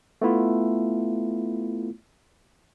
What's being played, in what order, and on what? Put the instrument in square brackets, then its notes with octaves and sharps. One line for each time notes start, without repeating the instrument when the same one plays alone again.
[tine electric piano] A3 B3 E4 F4